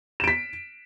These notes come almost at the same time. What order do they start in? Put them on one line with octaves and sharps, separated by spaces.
E7 D7 B6